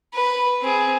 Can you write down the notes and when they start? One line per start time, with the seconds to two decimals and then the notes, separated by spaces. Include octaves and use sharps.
0.14 B4
0.61 C4 G#4